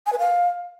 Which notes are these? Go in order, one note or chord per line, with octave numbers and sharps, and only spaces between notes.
G#5
B4
F5